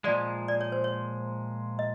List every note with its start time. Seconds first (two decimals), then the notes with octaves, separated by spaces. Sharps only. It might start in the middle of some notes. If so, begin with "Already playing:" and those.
0.04 A#2 F3 G#3 D5
0.48 D5
0.61 C#5
0.72 C5
0.84 C#5
1.79 D#5